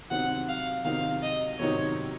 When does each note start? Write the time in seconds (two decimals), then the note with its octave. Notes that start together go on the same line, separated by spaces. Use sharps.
0.11 C3 D#3 F#3 C4 D#4 F#5
0.48 F5
0.85 C3 D#3 F#3 C4 D#4 F5
1.22 D#5
1.59 C3 D#3 F#3 C4 D#4 C#5